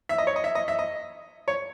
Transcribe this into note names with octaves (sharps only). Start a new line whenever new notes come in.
E5
D#5
C#5
D#5
E5
D#5
E5
D#5
C#5